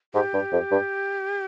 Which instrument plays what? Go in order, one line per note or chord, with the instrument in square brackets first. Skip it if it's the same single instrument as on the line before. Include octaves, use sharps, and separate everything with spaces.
[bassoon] G#2 [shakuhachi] G4
[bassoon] G2
F2
G2